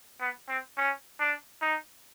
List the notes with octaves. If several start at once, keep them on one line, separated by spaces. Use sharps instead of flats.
B3
C4
C#4
D4
D#4